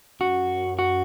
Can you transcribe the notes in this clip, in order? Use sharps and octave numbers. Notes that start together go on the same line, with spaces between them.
F#2 F#4
F#4